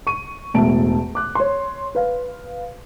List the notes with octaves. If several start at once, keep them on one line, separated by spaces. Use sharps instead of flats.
C#6 D#7
E1 E2 A2 E5 A5 D7
D6 F#6
C#5 C6
B4 F5